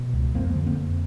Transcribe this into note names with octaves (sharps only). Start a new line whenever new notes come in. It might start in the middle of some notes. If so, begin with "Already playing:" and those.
Already playing: B2
C#2
F2 A#3 C4
D3
A#3 C4
F2